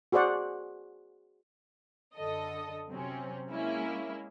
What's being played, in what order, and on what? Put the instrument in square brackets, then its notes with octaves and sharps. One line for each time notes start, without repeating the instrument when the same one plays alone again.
[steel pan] F#4 G#4 C5 D5 F#5
[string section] F#2 D3 A4 D#5 D#6
C3 F#3 C4 C#4
G#3 A#3 C#4 E4